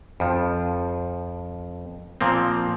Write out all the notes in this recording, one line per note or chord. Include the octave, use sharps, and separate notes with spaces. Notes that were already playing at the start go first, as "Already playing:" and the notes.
F2 F3
A#2 F3 A#3 C4